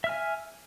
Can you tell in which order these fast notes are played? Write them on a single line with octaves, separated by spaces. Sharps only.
E5 F6 G#5